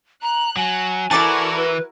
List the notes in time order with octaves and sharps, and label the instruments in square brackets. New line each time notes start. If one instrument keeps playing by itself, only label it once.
[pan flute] A#5 [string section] F#6
[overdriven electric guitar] F#3 [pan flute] G#5
[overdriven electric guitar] E3 [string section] E4 F#4 A#4 [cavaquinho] A4 D5 A5
[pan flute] B4